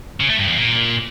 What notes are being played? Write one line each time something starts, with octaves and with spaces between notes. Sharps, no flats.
C#3
A3
G2
E2
A#2